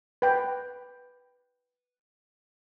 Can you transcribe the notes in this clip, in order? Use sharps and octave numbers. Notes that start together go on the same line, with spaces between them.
B4 G5